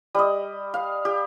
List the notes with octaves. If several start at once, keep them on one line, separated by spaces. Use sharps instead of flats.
G3 D#5
F5
G4